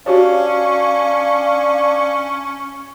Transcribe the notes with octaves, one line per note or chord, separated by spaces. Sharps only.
C#4 D4 F#4 G4 C#5 F5